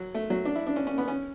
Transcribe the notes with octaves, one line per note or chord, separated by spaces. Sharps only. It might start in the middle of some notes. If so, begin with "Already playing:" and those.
Already playing: F#3
A3
F#3
D4
E4
D4
C#4
C#4
B3
C#4